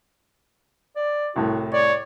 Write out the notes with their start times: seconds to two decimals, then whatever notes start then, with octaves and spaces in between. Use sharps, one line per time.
0.96 D5
1.36 C2 A2 F#4
1.73 C#5 D5